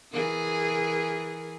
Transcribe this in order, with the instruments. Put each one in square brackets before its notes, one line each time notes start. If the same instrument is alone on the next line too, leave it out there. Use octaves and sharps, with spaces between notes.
[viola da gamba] E3 G#4 A#4